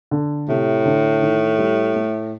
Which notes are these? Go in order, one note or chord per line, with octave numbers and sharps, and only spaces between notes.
D3
A2 C3
D3
D#3
G3
A3